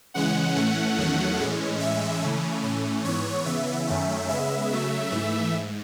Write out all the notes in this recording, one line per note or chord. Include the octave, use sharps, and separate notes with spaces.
C#3 E3 G#3 C#4 F#5
A2 E3 A3 C#4
E2 D#3 F#3 A3 C#4
A2 E3 G#3 C#4
A2 E3 G#3 C#4 E5
C#3 E3 A3 C#4
A2 E3 A3 C#4
G#2 E3 B3 C#5
C#3 E3 B3 E5
F#2 D#3 A3 C#4
C#3 G#3 B3 E5
C#3 F#3 A3
G#2 E3 A3
G#2